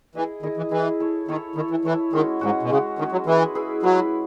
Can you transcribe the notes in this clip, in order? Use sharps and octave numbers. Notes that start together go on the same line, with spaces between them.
E3 E4 G#4 D#5
D#3 E4 G#4 D#5
E3
E3 E4 G#4 D#5
E4 A4 C#5
D#3 E4 A4 C#5
D#3 E4 A4 C#5
E3
E3 E4 A4 C#5
D#3 G#3 C#4 F#4
G#2 G#3 C#4 F#4
B2
C#3 G#3 C#4 F#4
D#3 G#3 C#4 F#4
F#3
E3 E4 G#4 B4
E4 G#4 B4
F#3 E4 G#4 B4